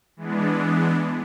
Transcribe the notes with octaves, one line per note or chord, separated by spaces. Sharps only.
E3 G#3 B3 D4